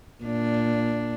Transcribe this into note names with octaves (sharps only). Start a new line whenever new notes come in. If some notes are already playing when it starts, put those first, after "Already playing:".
A#2 D4